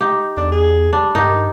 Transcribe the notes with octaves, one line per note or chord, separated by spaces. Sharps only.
D#4 G4
E2 D4
G#4
G3 D4
G2 D#3 D#4 G4